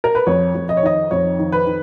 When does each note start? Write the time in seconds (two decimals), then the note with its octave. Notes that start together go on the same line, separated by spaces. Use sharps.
0.04 A#4
0.15 B4
0.27 F2 C#5
0.55 F2
0.69 D#5
0.77 C#5
0.83 D#3 D#5
1.11 F2 C#5
1.39 D#3
1.52 B4
1.66 D#3